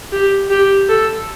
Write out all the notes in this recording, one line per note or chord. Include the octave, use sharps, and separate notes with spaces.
G4
G4
A4